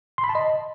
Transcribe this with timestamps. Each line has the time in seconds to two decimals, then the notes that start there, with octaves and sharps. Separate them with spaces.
0.18 C6
0.24 B5
0.29 A5
0.35 D#5